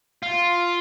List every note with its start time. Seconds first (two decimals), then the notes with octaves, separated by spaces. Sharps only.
0.23 F4